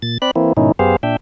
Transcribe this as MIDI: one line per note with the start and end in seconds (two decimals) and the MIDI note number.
0.02 0.18 46
0.02 0.18 93
0.22 0.31 60
0.22 0.31 74
0.22 0.31 83
0.22 0.31 90
0.36 0.53 52
0.36 0.53 58
0.36 0.53 60
0.36 0.53 64
0.57 0.72 44
0.57 0.72 47
0.57 0.72 51
0.57 0.72 61
0.57 0.72 63
0.57 0.72 64
0.79 0.96 42
0.79 0.96 59
0.79 0.96 67
0.79 0.96 68
0.79 0.96 72
0.79 0.96 77
1.03 1.16 46
1.03 1.16 62
1.03 1.16 76
1.03 1.16 79